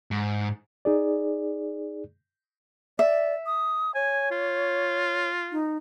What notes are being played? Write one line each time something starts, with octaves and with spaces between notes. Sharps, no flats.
G#2
D#4 G#4 D5
D5 E5
D#6
C#5 G#5
F4
D#4